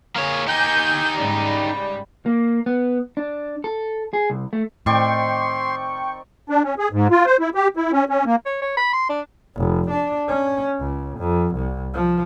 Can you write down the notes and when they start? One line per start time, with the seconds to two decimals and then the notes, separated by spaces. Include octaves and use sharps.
0.16 A#3 G#4 C#5
0.47 D#4 G4 G#5 G6
1.16 G#2 C#3 G3
2.26 A#3
2.66 B3
3.17 D4
3.64 A4
4.13 G#4
4.30 C2
4.53 A3
4.86 A2 D#3 C4 D5 G5 C6 C#6
6.50 D4
6.64 C#4
6.79 G#4
6.93 G#2
7.11 F4
7.26 C5
7.40 E4
7.55 G4
7.76 E4
7.92 C#4
8.09 C#4
8.26 A#3
8.46 C#5
8.62 C#5
8.77 B5
8.93 C6
9.09 D4
9.57 F1
9.90 D4
10.29 C#4
10.80 C#2
11.19 F2
11.55 C2
11.94 F3